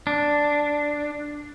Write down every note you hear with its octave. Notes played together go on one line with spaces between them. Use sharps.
D4